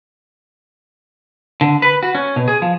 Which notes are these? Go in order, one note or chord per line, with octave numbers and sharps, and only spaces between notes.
D3
B4
F#4
C#4
B2
G#4
F3